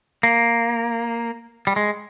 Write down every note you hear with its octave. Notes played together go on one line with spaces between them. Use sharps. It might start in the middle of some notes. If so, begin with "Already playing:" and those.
A#3
G3
G#3